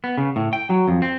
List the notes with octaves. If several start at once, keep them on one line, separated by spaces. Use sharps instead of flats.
B3
C#3
A2
G5
F#3
F2
C4